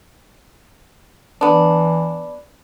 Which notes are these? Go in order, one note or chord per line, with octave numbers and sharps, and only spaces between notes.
E3 B3 D4